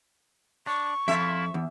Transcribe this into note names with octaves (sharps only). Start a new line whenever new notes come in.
D4 C#6
F2 E4 F4 E5
E2